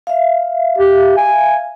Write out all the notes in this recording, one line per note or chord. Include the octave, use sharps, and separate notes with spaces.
E5 F5
G4
G#5